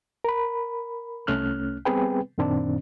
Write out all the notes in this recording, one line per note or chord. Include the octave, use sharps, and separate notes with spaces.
A#4 B5
C2 A3 C#4 F6 F#6
G3 B3 C4 G#4 B4 G5
F#2 A#2 D#3 C4 D4